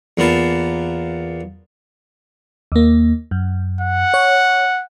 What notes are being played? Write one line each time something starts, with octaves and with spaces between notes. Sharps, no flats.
E2 A#3 B3 F4 A5
D#2 A#3
F#2
F#5
C#5